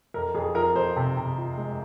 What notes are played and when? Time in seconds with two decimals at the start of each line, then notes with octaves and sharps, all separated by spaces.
0.14 F2 A#4
0.35 F2 G#4
0.54 F3 A#4
0.75 F2 C5
0.96 C3
1.17 C3
1.38 F3
1.58 G#3